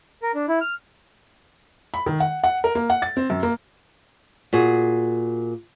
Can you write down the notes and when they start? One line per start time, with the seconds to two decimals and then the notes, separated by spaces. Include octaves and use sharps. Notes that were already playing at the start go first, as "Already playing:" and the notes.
0.23 A#4
0.35 D4
0.49 E4
0.61 F6
1.94 B5
2.06 D#3
2.20 F#5
2.44 F#5
2.64 A#4
2.75 A#3
2.90 F#5
3.02 A6
3.17 C4
3.30 F#2
3.43 A#3
4.53 A#2 F#4 G#4